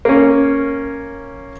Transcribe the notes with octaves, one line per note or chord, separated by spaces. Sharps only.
A#3 C#4